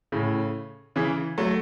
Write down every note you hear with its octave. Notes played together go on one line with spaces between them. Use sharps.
A2 C#3
C#3 E3
F#3 A3